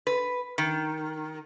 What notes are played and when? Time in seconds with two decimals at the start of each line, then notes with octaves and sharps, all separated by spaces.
0.07 B4
0.58 D#3